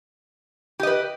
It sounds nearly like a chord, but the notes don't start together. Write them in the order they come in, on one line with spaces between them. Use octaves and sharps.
G4 D#5 B4